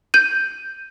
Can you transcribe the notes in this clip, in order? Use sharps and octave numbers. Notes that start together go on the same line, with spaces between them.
G6 D#7